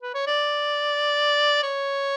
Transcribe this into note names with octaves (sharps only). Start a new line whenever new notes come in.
B4
C#5
D5
C#5